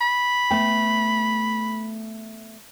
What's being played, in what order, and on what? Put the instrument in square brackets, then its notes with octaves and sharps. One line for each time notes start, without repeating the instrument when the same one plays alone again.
[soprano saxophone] B5
[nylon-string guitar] A3 B3 G5